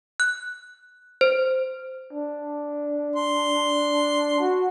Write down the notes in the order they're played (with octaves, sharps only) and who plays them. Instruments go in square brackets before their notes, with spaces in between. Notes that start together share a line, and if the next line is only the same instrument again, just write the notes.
[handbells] F#6
C5
[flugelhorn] D4
[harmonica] C6
[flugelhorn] F#4